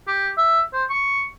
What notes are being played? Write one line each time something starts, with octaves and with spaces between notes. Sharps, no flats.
G4
E5
C5
C#6